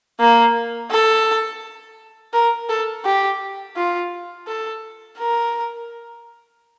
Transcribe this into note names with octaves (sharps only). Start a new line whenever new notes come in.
A#3
A4
A#4
A4
G4
F4
A4
A#4